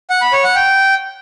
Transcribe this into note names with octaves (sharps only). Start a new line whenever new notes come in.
F#5
B5
C#5
F#5
G5